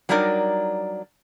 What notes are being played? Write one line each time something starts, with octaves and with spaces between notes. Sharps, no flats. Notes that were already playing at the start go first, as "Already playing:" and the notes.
F#3 G3 D4 D#4 A#4 D5